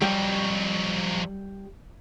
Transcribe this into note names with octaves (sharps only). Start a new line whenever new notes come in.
F2 F#3 G3